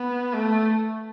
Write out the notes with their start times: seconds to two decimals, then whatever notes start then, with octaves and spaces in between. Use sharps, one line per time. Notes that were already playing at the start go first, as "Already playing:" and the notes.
Already playing: B3
0.33 A3